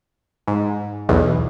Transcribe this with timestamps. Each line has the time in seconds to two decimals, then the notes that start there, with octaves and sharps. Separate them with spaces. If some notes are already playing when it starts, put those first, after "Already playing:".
0.47 G#2
1.09 B1 E2